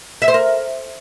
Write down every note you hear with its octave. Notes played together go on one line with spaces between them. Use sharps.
E5
C5
A#4